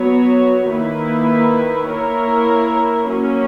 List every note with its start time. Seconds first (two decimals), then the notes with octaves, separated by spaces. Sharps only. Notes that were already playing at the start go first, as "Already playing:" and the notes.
Already playing: F#3 B3 F#4 C#5
0.71 D#3 A#3 E4 B4
1.90 A#3 E4 A#4 C#5
3.08 F#3 A#3 C#4